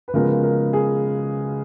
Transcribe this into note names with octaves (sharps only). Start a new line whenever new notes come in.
B4
C#3 F3 G#3 B3 A#4
A#4
A#4
G#4